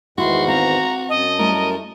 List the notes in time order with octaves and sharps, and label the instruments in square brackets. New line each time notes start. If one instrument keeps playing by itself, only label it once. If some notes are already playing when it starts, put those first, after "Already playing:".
[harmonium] E2 G#2 D#3 [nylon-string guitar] E4 G4 A#4 [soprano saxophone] F#4 [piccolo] C6
[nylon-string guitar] C4 F5 [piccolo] A#5
[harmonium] F#2 A5 [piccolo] D#5
[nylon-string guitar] G3 A3 E4 [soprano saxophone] A#4